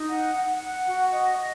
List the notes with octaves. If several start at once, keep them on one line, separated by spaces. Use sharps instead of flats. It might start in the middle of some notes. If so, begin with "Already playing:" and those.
Already playing: D#4
F#5
F#5
F#5
F#4
D#5
D#5